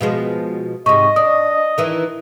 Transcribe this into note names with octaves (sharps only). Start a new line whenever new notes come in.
B2 F3 G#3
G#2 C3 D#5 C#6
D4 D#6
D#3 E3 D4